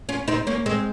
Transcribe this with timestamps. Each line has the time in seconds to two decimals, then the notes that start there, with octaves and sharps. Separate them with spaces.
0.09 C#4 F4
0.28 C4 D#4
0.47 A#3 C#4
0.66 G#3 C4